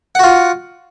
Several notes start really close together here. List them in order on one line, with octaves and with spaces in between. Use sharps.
F#5 F#4 F4